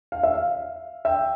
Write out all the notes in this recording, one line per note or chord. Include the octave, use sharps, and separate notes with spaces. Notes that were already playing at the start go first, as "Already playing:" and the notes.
F5
E5
F5
E5 G5